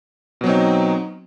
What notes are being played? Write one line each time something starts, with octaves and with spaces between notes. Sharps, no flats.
B2 F#3 C4 D#4